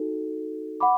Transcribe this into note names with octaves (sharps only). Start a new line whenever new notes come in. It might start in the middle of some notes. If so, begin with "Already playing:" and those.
Already playing: D#4 F#4 A4
F#5 B5 D6